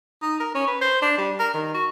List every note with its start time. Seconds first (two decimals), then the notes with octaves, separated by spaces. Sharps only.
0.22 D#4
0.40 A#4
0.55 C#4
0.67 B4
0.81 C5
1.02 D4
1.18 G3
1.39 A#4
1.54 D#3
1.74 F#4